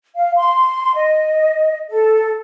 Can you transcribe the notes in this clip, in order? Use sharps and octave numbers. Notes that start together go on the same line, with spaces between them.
F5
C6
D#5
A4